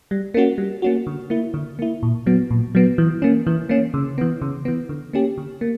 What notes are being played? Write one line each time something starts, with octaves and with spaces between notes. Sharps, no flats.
G3
A#3 C#4 F#4
G3
A#3 C#4 F#4
D3
A#3 E4
D3
A#3 E4
A#2
F#3 B3
A#2
F#3 B3
E3
A#3 C#4
E3
A#3 C#4
C#3
E3 B3
C#3
E3 B3
D3
A#3 C#4 G4
D3
A#3